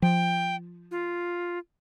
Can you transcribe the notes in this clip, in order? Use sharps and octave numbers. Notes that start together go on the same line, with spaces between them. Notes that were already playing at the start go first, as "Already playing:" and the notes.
F3 G5
F4